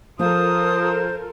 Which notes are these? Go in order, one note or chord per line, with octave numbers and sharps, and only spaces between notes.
F3 F4 A4 A#4 C5 D#6